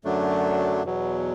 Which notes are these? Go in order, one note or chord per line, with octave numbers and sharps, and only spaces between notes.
F#2 D3 F#3 A3 D4
E2 B2 F#3